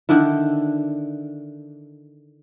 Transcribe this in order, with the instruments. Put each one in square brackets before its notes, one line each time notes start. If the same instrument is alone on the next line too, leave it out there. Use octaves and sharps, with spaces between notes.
[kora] D3 D#3 D4 E4